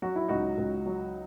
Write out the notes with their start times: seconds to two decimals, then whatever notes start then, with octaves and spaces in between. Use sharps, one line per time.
0.02 F#3 F#4
0.16 E4
0.28 C#2 D#4 F#4
0.58 C#2
0.86 F#3